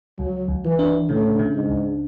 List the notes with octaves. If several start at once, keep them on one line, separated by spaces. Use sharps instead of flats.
C#2 F#3
C#2
E3
D4
A2 C#3
C#3
G#2
C#2